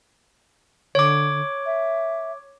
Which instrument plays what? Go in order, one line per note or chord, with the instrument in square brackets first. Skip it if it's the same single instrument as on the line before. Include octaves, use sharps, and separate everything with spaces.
[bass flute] D3 [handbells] C#5 D6
[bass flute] E5